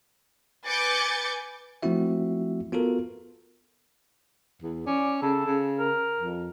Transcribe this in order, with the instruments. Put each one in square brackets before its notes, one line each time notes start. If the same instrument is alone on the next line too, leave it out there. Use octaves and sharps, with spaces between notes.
[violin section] B4 G#5 D6 G6 A6 C#7
[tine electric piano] F3 A3 C4 E4 F#4 E5
B3 F4 F#4 A4 A#4
[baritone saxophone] E2
[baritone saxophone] C#4 [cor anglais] D5
[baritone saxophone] C#3 [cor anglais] A4
[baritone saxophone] C#3
[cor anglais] A#4
[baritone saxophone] F2